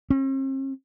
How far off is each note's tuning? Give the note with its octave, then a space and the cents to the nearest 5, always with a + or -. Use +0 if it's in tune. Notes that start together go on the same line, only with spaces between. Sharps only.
C4 +45